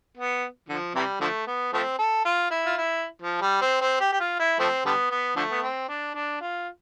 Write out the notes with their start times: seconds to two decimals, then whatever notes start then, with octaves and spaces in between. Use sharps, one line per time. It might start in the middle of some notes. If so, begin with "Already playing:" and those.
0.17 B3
0.69 D3 F3
0.95 C3 E3 G3
1.21 D3 F3 A3
1.47 B3
1.73 F3 A3 C4
1.99 A4
2.25 F4
2.51 E4
2.66 F4
2.78 E4
3.22 F3
3.41 G3
3.62 C4
3.81 C4
4.01 G4
4.13 G4
4.20 F4
4.40 E4
4.59 F3 A3 C4
4.86 D3 G3 B3
5.11 B3
5.36 D3 F3 A3
5.51 B3
5.63 C4
5.89 D4
6.15 D4
6.41 F4